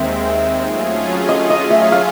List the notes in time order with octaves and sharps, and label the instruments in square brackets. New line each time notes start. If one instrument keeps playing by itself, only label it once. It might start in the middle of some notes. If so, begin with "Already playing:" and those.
Already playing: [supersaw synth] D#2 D#3 G#3 C4 [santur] E5
[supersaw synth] F#3 A3 C#4 F4 G#4
[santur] D#5
D#5
E5
F5